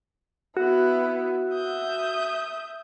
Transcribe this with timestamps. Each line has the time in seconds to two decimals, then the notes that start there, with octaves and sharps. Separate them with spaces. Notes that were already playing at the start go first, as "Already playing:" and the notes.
0.57 B3 E4 F#4
1.52 E5 D#6 G6